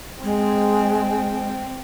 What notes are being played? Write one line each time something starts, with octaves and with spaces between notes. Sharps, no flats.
G#3 C4